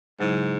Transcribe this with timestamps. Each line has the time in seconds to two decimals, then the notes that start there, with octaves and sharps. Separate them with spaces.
0.20 G#2 C#3 F#3 E4